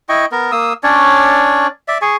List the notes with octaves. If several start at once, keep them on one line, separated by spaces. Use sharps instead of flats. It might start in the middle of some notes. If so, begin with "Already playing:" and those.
E4 D#5 G5 C#6
B3 A#4
A#3 D#6 E6
C#4 D4 C#5 D5
D5 E5
G#4 G#5 C#6